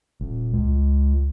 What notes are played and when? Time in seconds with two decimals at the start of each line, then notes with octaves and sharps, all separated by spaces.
0.20 D#1
0.53 C#2